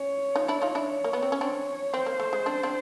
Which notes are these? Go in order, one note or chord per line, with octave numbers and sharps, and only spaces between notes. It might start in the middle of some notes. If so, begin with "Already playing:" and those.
Already playing: C#4 C#5
D#4 F4
D4 E4
D#4 F4
D4 E4
C#5
A#3
B3
C4
C#4
C4 D4
C4 C5
A#3
A3
G#3
C4 D4
C4 D4